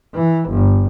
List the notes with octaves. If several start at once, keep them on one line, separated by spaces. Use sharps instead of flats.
E3
G1